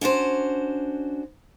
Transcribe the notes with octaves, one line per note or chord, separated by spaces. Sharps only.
C#4 D4 F#4 C5